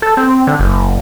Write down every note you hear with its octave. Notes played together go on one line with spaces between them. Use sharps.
A4
C4
D3
F#1